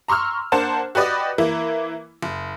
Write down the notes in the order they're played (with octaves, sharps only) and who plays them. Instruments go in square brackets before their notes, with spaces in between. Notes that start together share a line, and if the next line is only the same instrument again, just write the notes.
[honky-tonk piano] A#5 C6 C#6 E6 F6
A#3 D4 C5 F#5 A5
F#4 G4 B4 D5 D#5
E3 A#3 E4
F#1